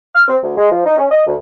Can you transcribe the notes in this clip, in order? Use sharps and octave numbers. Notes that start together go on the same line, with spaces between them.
F6
C4
D2
G#3
F3
D#4
C#4
D#5
D2